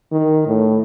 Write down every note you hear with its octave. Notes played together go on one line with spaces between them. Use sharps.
D#3
A2